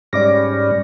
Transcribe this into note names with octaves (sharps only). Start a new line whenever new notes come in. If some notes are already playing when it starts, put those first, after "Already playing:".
G#2 G3 C#4 D5 D6 A#6